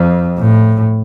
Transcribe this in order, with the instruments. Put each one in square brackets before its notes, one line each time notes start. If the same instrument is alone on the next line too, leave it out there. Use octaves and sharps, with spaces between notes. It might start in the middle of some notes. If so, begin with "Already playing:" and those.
Already playing: [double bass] F2
A2